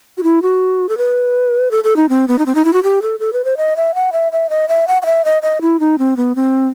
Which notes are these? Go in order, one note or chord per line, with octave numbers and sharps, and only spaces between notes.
F#4
E4
F#4
A4
B4
A4
A4
D#4
C4
B3
D#4
C4
D#4
E4
F#4
G4
A4
A4
B4
C5
D#5
E5
F#5
E5
E5
D#5
E5
F#5
F#5
E5
D#5
D#5
E4
D#4
C4
B3
C4